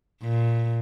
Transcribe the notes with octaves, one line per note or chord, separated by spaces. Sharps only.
A#2